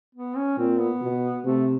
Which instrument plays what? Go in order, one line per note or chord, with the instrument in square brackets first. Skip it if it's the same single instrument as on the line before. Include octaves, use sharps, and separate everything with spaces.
[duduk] B3
C#4
[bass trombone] A#2 [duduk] C4
[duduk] B3
[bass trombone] B2
[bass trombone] C3 [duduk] A3